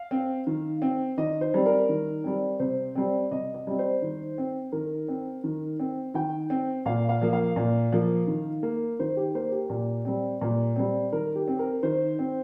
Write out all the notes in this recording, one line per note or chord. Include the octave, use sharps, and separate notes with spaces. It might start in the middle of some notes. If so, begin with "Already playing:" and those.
Already playing: F5
C4
D#3
C4
D#3 D#5
C5
G3 C4
A#4
D#3
G3 C4
C3 C5
G3 C4
C3 D#5
D#5
G3 C4
C5
D#3
C4
D#3 A#4
C4
D#3
C4
D#3 G5
C4
A#2 F5
F5
F3 A#3
F5
A#2
F3 A#3
D#3
A#3
D#3 C5
G4
A#3 C5
G4
A#2
G3 C4
A#2
G3 C4
D#3 A#4
G4
C4
A#4
D#3 C5
C4